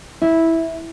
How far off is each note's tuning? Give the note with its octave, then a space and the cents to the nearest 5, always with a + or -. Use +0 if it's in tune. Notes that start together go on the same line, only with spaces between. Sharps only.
E4 -10